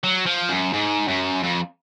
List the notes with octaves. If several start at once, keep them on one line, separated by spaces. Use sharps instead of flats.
F#3
F3
F#2
G#2
F#2
F2